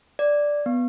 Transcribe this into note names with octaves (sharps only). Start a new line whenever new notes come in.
D5
B3